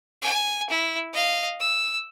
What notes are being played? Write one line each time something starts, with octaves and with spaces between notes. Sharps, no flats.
G#5
E4
D#5 F5
E6